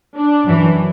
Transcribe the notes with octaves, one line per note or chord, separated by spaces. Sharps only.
D4
F#2 E3